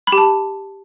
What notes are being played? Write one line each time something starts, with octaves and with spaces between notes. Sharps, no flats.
B5
G4
A5